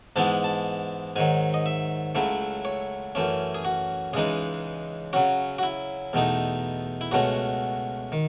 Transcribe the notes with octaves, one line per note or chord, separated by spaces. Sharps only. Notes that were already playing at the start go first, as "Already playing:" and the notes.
G#2 E3 G#3 B3 E4 A5
A5
G#2 D#3 F#3 G#5
D#5
E5
C#2 C#3 F#3 A3 E4
C#5
F#2 E3 A3 C#4
G#4
F#4
C#2 C#3 E3 G#3 D#4 G#4
C#3 F#3 C#4 F#4
F#4
E4
E2 B2 A3 D#4
E4
C#2 B2 A3 C#4 F#4
D#3